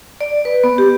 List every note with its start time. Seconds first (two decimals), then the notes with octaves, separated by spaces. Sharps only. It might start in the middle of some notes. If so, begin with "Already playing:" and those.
0.21 D5
0.45 B4
0.64 B3
0.78 G4